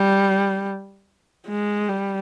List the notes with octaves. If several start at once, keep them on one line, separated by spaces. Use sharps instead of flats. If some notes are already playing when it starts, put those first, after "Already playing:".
Already playing: G3
G#3
G3